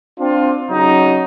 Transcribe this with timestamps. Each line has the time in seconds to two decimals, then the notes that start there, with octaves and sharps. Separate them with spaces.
0.19 C4 D4 F4
0.71 C#3 F#3 D#4